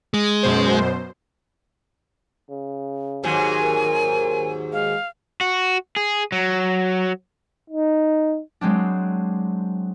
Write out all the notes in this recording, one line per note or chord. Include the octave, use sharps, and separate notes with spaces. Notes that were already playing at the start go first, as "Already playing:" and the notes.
G#3
F#2 B2 C5
C#3
D#2 G#2 F#3 G#5
A#4
G#3 F5
F#4
G#4
F#3
D#4
F#3 G#3 C4 D4